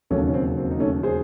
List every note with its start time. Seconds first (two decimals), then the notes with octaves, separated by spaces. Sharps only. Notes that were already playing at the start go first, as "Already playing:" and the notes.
0.10 E1 D#2 C#3 F#3 A3 C#4
0.28 C#4
0.34 C4
0.57 C4
0.71 D#4
0.80 A3 C#4
1.03 G#4 C5